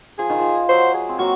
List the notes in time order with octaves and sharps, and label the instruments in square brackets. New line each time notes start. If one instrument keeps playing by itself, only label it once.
[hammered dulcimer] F3 [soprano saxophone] G#4
[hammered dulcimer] D#3
F3
[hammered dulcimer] F#3 [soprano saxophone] C5
[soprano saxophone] G#4
[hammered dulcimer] C4
[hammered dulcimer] F#3 A#3 [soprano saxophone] F#4